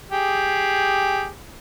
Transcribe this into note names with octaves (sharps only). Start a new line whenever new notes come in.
G4 G#4